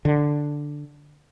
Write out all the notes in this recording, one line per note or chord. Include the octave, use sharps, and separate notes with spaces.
D3